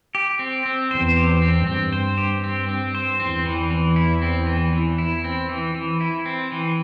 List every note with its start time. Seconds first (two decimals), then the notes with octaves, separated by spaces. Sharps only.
0.15 G4
0.39 C4
0.66 C4
0.91 E2 C5
1.16 G4
1.42 C4
1.67 G2 C4
1.92 C5
2.17 G4
2.44 C4
2.68 C4
2.95 C5
3.20 E2 C4
3.45 E3
3.71 E3
3.96 E4
4.22 C4
4.47 E3
4.73 E3
4.98 E4
5.24 C4
5.49 E3
5.74 E3
6.01 E4
6.26 C4
6.52 E3